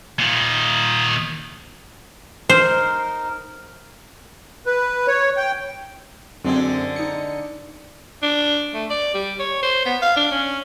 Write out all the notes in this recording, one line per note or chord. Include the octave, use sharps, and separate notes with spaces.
A#2 D#3
D#4 A#4 C5
B4
C#5
G5
F#2 D3 G#3 C4
D#4 C#7
D4
A3
D5
G3
C#5
C5
B3
F5
D4
C#4